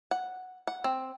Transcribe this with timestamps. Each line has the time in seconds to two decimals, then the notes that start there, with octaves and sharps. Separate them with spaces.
0.11 F#5
0.67 F#5
0.84 C4